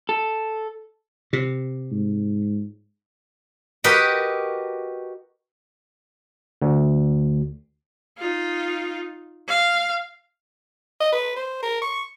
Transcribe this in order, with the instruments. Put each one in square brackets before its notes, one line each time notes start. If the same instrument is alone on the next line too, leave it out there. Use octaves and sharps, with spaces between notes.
[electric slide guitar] A4
[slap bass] C3
[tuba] G#2
[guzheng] F#4 G4 A#4 B4 D#5
[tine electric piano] D2
[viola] D#4 F4
F5
[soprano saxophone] D#5
B4
C5
A#4
C#6